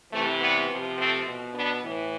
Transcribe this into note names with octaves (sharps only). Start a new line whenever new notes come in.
C3 E3 A3
G3 B3
C3 F3
A3 C4
B2
B3 D4
A2 E3